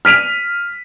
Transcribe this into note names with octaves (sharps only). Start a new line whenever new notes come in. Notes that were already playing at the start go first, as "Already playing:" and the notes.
F6 B6 D#7 F7